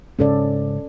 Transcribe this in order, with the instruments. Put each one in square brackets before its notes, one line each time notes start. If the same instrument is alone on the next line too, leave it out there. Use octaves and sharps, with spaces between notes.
[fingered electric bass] G#2 C#3 [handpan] C#4 A4 D5